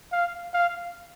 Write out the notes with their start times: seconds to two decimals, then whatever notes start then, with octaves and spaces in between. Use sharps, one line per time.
0.12 F5
0.54 F5